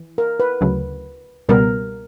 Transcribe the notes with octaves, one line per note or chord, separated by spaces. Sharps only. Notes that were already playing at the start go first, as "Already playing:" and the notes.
Already playing: E3
A#4
B4
D2 C#3 F#3 A3
C#2 B2 G3 B3 A#4